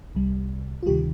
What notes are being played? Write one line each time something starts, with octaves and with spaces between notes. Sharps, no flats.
C2 C3 G3
F4
D2 C3 D#3 G3 G4